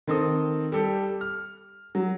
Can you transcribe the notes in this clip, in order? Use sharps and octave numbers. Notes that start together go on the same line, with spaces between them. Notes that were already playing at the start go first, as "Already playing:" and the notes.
D#3 C4 A4 D#6
G3 G4 A4
F6
F#3